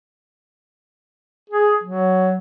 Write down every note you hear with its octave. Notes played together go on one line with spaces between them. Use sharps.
G#4
F#3